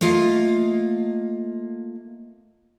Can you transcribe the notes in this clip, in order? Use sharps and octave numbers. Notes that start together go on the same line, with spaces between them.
A3 A#3 F4 D#5 F5